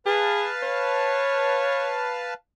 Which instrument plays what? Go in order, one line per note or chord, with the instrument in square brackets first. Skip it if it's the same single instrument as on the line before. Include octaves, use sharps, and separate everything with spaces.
[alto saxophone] G#4 [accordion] B4 F5 A5
[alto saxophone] C#5